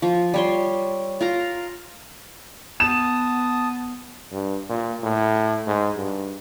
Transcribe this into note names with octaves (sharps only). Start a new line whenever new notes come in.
F3
G3 C#5 C6
F4 A#4 A#5
B3 A5 D#6 E7
G2
A#2
A2
G#2
G2